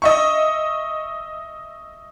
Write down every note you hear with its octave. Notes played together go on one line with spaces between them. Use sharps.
D#5 E5 C#6